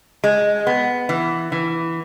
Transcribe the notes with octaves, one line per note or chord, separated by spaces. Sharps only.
G#3
B3
E3
E3